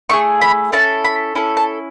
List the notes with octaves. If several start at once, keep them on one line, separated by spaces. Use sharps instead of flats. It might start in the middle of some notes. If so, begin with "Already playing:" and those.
A3 E4 G#4 C#6
B5
C#4 E4 A4 A5
B5
C#4 E4 A4
A5